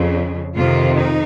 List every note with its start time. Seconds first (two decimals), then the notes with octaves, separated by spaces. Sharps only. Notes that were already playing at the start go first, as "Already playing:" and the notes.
Already playing: F2 C#3
0.55 F2 C3 D#3 F4
0.96 D#4